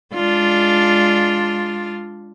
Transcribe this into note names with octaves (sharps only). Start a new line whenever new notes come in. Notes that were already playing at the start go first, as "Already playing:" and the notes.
G#3 D4 F4